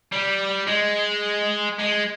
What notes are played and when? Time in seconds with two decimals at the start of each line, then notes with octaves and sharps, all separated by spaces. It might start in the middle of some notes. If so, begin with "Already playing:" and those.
0.12 G3
0.67 G#3
1.79 G#3